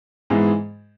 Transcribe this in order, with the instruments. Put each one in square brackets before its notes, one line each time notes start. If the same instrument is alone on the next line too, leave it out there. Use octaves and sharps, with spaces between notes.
[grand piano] G#2 E3 G#3 B3 G#4